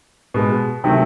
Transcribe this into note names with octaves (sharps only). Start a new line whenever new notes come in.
B2 G#3
C3 D#3 F#3 A3